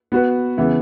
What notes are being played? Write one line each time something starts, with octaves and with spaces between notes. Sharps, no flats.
B3 F#4 B4
C#3 E3 B3 E4